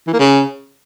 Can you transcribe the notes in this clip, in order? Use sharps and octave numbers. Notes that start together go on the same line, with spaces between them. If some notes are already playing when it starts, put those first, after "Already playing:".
E3
A#3
C#3